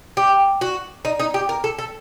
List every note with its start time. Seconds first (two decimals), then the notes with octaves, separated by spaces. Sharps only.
0.17 G4
0.61 F#4
1.05 D#4
1.20 D#4
1.34 G4
1.49 A#4
1.64 A4
1.79 A4